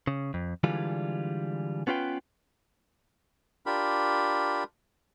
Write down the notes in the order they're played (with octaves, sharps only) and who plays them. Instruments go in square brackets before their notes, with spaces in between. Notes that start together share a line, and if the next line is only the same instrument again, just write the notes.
[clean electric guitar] C#3
F2
D3 E3 G3 G#3 F4
B3 C#4 F4 B4 G5
[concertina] D4 F4 G4 A#4 B5